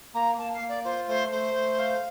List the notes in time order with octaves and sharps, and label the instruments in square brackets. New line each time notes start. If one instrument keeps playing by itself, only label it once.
[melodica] A#3 [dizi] A#5
[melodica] A#3 [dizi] A5
[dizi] F5
[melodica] A#3
[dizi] D5
[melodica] F4 [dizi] C5
[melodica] A3 [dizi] C5
[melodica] A3 [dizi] C5
[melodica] A3
F5